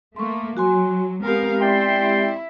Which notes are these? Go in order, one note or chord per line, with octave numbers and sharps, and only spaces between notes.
A3 A#3 C6 C#6
F#3 F#4 G#5 C6
G#3 B3 C4 G4 A#4 F5
E4 D5 G5 C6